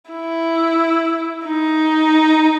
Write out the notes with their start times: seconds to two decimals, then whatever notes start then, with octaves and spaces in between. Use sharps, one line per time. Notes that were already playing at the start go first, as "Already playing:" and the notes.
0.10 E4
1.45 D#4